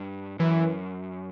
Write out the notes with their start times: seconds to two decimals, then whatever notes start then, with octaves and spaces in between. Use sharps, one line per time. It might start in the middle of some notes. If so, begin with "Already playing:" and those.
Already playing: G2
0.39 F#2 E3